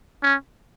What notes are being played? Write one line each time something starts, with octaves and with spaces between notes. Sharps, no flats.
C#4